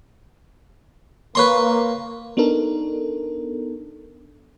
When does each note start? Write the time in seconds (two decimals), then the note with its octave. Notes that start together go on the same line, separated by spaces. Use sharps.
1.35 A#3 B4 C#5 C6
2.37 B3 D4 D#4 A4 A#4